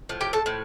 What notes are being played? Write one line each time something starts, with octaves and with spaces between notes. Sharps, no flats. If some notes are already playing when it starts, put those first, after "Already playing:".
A2 F3
G4 G5
A4 A5
A2 F3